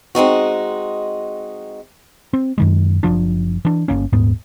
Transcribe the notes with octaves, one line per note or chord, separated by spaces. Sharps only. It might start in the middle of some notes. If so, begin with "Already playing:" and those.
G#3 C4 D#4 F#4
C4
F#2 D#3 G#3
F#1 E2 F3 D4
E3 D4
G1 A2 A#3 C#4
D#1 G#2 B3